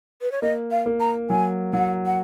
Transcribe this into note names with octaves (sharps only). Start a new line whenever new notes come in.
B4
C#5
A#3 D#5
F5
A#3
A#5
F#3 G#5
F#3 F#5
F#5